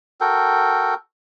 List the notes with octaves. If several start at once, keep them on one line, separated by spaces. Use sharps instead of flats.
F#4 A4 A#4 G5